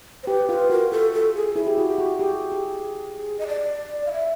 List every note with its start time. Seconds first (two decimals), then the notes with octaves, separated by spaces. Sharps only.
0.23 C5
0.27 G4 B4
0.49 F4 B4
0.70 F#4 A#4
0.91 F4 A4
1.13 A4
1.35 G#4
1.55 E4 G#4
1.67 G4
1.77 F#4
1.88 G4
1.98 F#4
2.19 G4 G#4
2.52 G4
3.39 D#5
3.48 D5
4.07 F5
4.12 E5